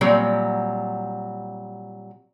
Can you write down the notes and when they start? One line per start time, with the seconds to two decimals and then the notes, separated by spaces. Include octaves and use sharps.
0.01 A#2 F#3 G3 C4